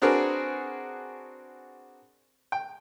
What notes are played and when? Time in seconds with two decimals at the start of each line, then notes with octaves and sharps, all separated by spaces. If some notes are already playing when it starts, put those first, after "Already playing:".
0.02 C4 D4 F#4 G#4 A#4 B4
2.52 G5